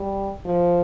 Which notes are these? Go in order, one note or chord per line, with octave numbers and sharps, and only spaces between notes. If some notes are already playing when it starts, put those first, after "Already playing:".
Already playing: G3
F3